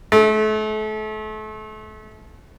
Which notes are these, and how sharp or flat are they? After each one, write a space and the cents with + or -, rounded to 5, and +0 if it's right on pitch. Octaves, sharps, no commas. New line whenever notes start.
A3 -35